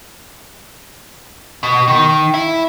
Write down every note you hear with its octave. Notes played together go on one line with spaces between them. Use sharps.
B2
D#3
E4